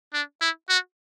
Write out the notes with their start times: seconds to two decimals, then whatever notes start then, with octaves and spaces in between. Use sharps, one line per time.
0.14 D4
0.41 E4
0.69 F#4